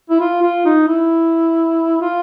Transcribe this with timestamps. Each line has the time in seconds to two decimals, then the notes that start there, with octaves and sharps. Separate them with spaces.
0.10 E4
0.20 F4
0.43 F4
0.66 D#4
0.88 E4
2.02 F4